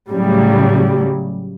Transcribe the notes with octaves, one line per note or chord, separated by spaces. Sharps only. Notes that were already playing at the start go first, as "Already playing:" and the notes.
A2 C#3 F#3 G3